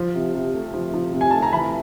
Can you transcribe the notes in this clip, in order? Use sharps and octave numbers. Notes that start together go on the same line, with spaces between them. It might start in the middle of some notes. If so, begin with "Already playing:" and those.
Already playing: F3
C3
C3
A3
F3
F3
C3
G#5
A3 A5
A#5
E3 B5